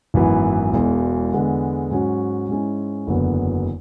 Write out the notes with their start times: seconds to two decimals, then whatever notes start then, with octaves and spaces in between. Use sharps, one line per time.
0.14 G#1 F#2 E3 B3 E4
0.73 E1 E2 B2 G#3
1.32 E2 D3 G#3 B3
1.91 G#2 F#3 C#4 F#4
2.49 G#2 G#3 C#4 E4
3.07 F#1 E2 D3 F#3 B3